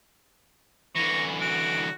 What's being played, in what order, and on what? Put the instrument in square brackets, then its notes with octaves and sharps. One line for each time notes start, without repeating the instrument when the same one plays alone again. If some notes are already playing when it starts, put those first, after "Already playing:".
[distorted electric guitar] D3 E3 [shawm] C#6 [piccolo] A#6
[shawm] F#4 [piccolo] D7